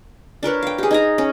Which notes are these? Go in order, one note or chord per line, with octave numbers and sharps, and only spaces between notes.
D4 A#4 B4 C#5
F5 G5
G4 G#4
D#4 G#5 A#5
C#4